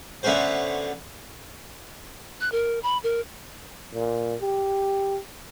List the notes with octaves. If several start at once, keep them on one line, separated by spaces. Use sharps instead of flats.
D3 A3 B3 C#4 F#4 C5
F#6
A#4
B5
A#4
A#2
G4